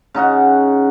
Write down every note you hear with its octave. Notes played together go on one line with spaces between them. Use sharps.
C#3 D#4 F#4 F#5